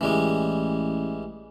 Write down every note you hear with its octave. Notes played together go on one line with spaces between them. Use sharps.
A1 E3 G3 G#3